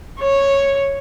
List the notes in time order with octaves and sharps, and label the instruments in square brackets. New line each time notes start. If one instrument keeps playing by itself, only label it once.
[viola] C#5